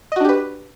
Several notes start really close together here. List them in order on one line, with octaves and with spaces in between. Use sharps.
D#5 F#4 D4 G4 B4